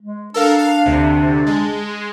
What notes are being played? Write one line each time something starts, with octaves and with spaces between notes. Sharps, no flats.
G#3
D4 A4 A#4 F5
F5
D2 C3
G#3